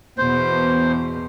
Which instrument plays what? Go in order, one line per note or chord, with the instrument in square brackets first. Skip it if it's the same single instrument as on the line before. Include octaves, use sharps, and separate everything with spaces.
[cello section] E2 B2 [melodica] C5